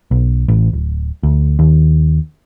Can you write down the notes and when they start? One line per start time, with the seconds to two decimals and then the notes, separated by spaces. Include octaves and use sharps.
0.11 B1
0.48 A1
0.73 D1
1.23 D2
1.59 D#2